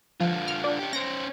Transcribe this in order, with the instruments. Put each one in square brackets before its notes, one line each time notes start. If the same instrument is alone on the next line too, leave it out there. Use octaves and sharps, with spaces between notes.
[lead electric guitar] D3 F4 [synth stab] F3
[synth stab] F6
D4
[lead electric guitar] C#4 G4
[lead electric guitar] C#4 C5 [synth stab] A#6 D7